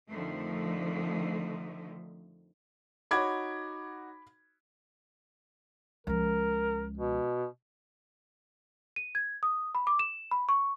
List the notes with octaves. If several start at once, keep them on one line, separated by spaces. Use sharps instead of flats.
F2 D3 D#3 F3 A3
D#4 F#4 C#5 B5 D6 G#6
C#2 F3 A#4
B2
D#7
G#6
D#6
B5
D6
E7
B5
C#6